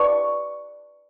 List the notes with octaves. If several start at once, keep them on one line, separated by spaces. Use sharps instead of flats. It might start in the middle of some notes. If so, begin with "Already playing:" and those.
Already playing: B4 D5 A5 C#6